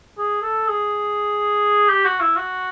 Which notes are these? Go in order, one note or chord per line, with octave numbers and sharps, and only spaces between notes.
G#4
A4
G#4
G4
F#4
E4
F#4